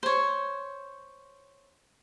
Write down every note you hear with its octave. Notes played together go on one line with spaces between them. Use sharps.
C5 C#5